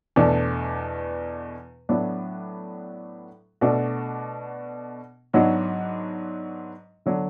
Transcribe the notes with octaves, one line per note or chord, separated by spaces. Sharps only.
E2 B2 A3 D4
A2 F#3 B3 D4
B2 A3 D4 F#4
G#2 F#3 B3 D4 F#4
D3 F#3 B3 D4